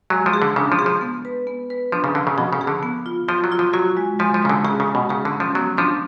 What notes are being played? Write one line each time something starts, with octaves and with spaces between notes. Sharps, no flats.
F#3 G#3
F3
G#4
D3
C#3 D4
F3
G#4
F3
B3
B4
B3
B4
F3 D4
C#3
D3 F3
C#3
B2 F3
C#3
G#4
D3
B3
F4
F3 F4
F#3
F4
F3
F#3 F#4
G#3
F3 G#3
F3
C#3 G#3
D3
C#3 G#4
C#3
G#3
B2
C#3 G#4
D3
C#4
F3
F#3 B3
F3 D4